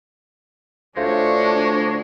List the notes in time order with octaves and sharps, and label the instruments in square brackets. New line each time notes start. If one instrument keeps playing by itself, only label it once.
[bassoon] D2 [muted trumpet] G#3 [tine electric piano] A3 F4 C5 [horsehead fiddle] D4 C#5